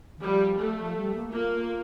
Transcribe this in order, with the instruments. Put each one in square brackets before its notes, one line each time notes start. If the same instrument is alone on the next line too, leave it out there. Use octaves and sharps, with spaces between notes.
[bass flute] D#3
[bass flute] F3 [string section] G3
[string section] A3
[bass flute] F3
G3
A#3
[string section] A#3 [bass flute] F4